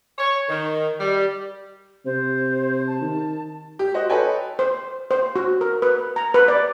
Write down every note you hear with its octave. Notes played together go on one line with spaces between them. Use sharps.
C#5
D#3
G3
C3 C5
A5
D#3
G4
F#4 C5 D#5
A4 B4 C#5 D#5 G5 G#5
C5
C5
F#4
A#4
B4
A#5
B4
D5